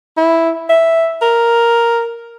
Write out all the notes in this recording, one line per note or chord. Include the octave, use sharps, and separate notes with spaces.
E4
E5
A#4